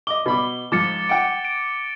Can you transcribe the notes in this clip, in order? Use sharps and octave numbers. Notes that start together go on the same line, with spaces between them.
D#5 D6 G7
B2 B5 D6
G#2 F3 D6 A6 C#7
F#5 G5 D7
D7